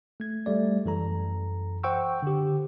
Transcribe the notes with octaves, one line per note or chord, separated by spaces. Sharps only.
A3 G#6
G3 A3 D5
F#2 E3 A4 A#5
C5 F#5 G5 C#6 E6
D3 G4